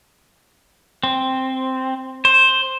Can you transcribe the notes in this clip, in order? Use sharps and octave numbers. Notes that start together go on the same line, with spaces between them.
C4
C5